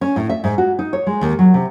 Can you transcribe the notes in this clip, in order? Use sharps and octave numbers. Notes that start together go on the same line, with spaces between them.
C#4
A2
E5
G#2
F#4
D#4
C#5
G#3
D#2
F#3
C3